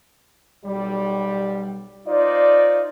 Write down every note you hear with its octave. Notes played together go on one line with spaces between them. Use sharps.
B1 G3
D#4 F4 C5 D5